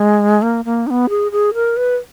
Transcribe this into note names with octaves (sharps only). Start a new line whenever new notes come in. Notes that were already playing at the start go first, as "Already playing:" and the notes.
Already playing: G#3
A#3
A#3
D#4
B3
G#4
G#4
A#4
B4